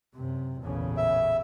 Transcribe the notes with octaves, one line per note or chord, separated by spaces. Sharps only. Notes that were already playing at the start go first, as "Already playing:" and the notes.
F#2 C3
A1 E2 A#2 C#3
E5